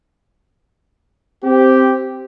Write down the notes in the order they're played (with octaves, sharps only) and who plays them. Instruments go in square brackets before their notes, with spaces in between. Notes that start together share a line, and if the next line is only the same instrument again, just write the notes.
[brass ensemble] C4 G4